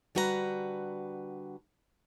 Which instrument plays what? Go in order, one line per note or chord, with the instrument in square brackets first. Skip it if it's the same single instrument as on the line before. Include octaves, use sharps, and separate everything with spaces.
[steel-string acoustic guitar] D3 G3 F#4 B4 C5 A#5